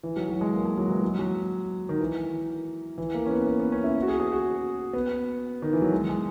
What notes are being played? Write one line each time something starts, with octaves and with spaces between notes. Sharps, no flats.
E3
F#3
F#3
G#3
A#3
G#3
F#3
E3
F#3
F#3
D#3
E3
E3
A#3
C#4
B3
B3
B3
C#4
E4
F#4
G#4
G#4
F#4
B3
D#3
E3
F#3
G#3
G#3